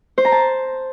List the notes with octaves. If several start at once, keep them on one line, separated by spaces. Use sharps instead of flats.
C5
A#5
A5